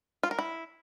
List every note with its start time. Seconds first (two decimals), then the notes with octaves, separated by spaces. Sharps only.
0.23 F4
0.31 A#4
0.39 E4